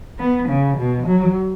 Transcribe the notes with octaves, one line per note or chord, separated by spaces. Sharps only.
B3
C#3
B2
F#3